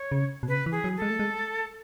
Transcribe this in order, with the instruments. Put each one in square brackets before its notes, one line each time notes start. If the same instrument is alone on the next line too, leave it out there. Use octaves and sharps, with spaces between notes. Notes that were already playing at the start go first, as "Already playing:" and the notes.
Already playing: [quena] C#5
[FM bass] C#3
B2
[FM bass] C#3 [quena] B4
[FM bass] E3
[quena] G#4
[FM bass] F#3
[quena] A4
[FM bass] G#3
A3
G#3